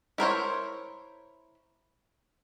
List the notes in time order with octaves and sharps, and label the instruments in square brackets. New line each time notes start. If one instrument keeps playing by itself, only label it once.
[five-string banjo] E4 A#4 C5 C#5